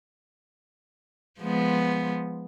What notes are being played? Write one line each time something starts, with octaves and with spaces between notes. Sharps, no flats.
F3 G#3 B3